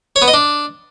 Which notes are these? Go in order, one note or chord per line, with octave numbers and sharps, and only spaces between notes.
C#5
B3
D#5
D4